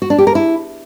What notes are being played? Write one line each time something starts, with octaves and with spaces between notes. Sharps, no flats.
F#4
D4
G4
A#4
E4